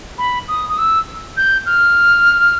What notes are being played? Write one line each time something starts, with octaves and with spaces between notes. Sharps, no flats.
B5
D#6
D#6
E6
G6
F6